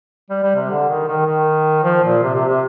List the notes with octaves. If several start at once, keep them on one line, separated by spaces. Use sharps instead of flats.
G3
G3
C3
D3
D#3
D#3
D#3
F3
A#2
C3
C3
C3